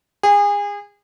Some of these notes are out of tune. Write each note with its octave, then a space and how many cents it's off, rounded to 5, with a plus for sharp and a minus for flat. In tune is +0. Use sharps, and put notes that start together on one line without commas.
G#4 -30